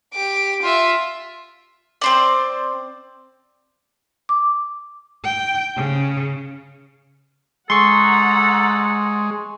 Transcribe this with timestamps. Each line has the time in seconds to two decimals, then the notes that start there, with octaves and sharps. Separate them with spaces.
0.14 G4 D6
0.62 F4 E5
2.01 C4 C5 D5
4.29 D6
5.24 G5
5.77 C#3
7.70 G#3 A4 F#5 A#5 C6 C#6